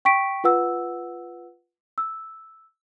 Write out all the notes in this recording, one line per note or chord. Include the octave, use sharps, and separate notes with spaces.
G5 C#6 B6 D7
F4 B4 F#5 E6
E6